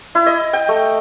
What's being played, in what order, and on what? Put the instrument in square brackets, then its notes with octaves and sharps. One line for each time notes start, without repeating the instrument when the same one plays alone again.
[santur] E4
D#5
G5
A3